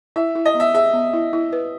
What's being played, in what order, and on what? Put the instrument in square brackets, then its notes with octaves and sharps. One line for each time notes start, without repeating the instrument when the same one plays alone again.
[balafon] E4 [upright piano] E5
[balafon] E4
[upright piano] D#5
[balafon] B3
[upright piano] E5
[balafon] G#4 [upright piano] E5
[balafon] B3
E4
E4
B4